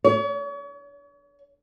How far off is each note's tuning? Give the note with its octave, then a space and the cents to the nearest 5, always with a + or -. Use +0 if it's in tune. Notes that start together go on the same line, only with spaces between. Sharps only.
C#5 +40